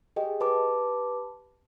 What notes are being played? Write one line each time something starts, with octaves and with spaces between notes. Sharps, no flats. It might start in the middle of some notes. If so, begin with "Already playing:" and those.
G4 G#4 D#5 G5
G4 B4 A5 B5 D6